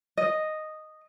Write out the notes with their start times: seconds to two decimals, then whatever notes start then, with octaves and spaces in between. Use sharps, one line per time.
0.17 D#5